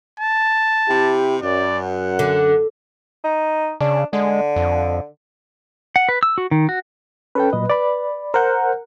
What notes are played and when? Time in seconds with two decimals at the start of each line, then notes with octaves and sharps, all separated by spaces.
0.20 A5
0.88 C3 E4 G4
1.42 F#2 D5
1.85 F#5
2.19 D3
3.24 D#4
3.81 C#3 D4
4.13 D3 G#3
4.56 F2
5.96 F#5
6.09 B4
6.23 E6
6.38 F#4
6.51 D#3
6.69 F#4
7.35 C#4 A4 B4 G5
7.53 A#2 F#3 D#5
7.70 D5 B5
8.34 A#4 C5 F#5 G6